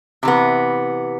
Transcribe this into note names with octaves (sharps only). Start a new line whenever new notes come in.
C3 E3 B3